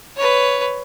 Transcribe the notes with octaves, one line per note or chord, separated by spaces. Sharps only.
B4 C#5